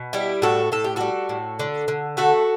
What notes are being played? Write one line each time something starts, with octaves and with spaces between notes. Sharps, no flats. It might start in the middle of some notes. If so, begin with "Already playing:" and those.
Already playing: B2
G3 E4 G4
A2 F#4 A4
A2 A4
G4
G3 F#4 A4
A2
D3
D3
A3 F#4 A4